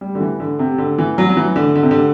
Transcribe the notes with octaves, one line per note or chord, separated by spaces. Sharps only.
G3
D3
E3
D3
C3
D3
E3
F#3
F#3
E3
D3
D3
C3
D3